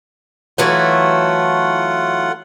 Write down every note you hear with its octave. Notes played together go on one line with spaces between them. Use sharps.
E3 F#3 A3 F4 F#5